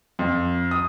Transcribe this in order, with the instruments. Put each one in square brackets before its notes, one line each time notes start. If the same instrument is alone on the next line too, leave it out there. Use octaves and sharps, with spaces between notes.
[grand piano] F2
D#6